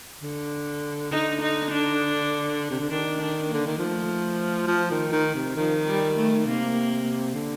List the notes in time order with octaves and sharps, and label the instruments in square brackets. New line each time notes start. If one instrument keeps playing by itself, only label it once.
[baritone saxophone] D3
[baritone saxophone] D3 [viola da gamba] D#4
[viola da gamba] D#4
D4
[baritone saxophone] C3
D3
[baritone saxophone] D#3 [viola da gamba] D4
[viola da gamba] D4
[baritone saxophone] D3 [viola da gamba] A#3
[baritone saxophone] D#3
[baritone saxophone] F3 [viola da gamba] A3
[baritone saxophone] F3
D#3
D#3
C3
[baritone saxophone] D#3 [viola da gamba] F3
[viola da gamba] G3
A3
[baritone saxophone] C3 [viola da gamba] A#3
[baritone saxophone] D3